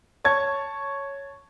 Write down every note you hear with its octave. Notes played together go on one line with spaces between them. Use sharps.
C#5 A5 C#6 G#6